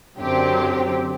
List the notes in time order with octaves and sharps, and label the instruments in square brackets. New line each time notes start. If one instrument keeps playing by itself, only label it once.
[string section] F#2 D3 F#3 C4 G4